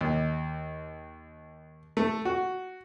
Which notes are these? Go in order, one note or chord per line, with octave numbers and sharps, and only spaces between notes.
D#2
A3
F#4